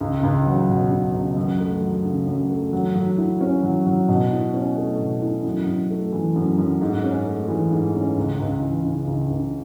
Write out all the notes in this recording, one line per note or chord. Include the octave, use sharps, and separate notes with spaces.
C#2
C#2
F#3
B2
C#2
C#2
F#2
A3
F#3
C#3
F#2
A3
F#3
F#3
E4
C#4
F#3
F#3
B2
E4
C#4
A3
B2
E4
F#2
F#2
A3
E3
F#2
F#2
G#2
C#4
A3
E3
G#2
C#4
C#2
C#2
E3
C#3
C#2
C#2